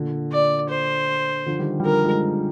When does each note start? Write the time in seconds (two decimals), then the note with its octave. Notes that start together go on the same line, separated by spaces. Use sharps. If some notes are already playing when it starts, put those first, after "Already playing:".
Already playing: A#2 D3
0.33 D5
0.70 C5
1.46 D3 F3
1.59 D#3 G3
1.80 G3
1.84 D3 F3 A#4
2.05 F3 G#3